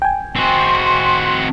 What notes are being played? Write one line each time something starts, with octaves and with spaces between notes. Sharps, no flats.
G5 G#5
C4 F#4 C6